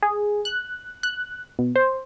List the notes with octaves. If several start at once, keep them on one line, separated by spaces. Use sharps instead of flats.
G#4
F#6
F#6
B2
C5